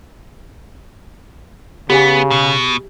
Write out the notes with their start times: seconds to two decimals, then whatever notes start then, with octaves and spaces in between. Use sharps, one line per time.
1.90 C#3 B3 G4 G#4 G#5
2.31 B2